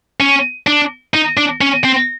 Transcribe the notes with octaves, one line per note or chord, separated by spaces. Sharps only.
C#4
D4
D#4
D4
C#4
C4